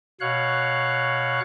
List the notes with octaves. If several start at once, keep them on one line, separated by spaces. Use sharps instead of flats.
B2 C#5 F5 F#6